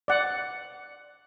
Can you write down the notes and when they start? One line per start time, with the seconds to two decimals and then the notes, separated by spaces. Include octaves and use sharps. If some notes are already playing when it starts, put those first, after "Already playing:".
0.08 D5 F#5